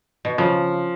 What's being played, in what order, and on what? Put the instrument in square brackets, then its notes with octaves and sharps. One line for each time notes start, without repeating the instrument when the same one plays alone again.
[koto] B2
[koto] C#3 [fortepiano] F3